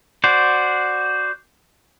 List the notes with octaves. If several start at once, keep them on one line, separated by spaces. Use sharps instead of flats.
F#4 C5 D5